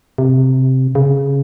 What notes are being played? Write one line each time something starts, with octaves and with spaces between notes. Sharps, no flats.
C3
C#3